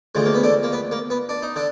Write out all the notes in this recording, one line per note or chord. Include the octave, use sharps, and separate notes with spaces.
D2 D3 F3 G#3
A#3
B3
D3 D4
A#3
B3
A#3
B3
D4
D#4
D3 D4